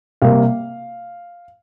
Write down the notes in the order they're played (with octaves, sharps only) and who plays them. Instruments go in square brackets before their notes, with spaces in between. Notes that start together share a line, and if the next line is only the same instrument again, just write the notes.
[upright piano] C3 G3 A#3 F5